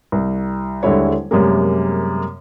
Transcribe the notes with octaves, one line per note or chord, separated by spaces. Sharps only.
C2
D#1 D3 G3 G#3 E4 C#5
F#2 C3 G3 G#3 A#3